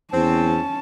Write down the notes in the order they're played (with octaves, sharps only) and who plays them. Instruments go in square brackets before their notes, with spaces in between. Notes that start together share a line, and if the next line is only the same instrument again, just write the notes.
[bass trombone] E2 [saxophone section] C4 [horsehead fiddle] C#4 A5